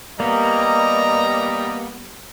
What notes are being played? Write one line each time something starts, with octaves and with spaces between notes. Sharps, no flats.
G3 A#3 B3 D#5 A#5